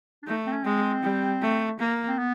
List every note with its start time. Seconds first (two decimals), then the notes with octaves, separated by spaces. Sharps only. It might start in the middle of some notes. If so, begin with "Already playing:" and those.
0.23 D4
0.26 A3 D#4
0.46 C4
0.53 C#4
0.65 G#3 C4
1.03 G3
1.42 A3
1.80 A#3
2.07 C4
2.18 B3